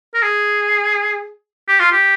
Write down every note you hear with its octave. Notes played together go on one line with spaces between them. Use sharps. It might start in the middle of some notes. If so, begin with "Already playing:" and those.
A#4
G#4
G4
F4
G4